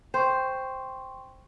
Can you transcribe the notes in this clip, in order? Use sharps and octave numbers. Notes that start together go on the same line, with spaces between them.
C5 G5 C6 C#6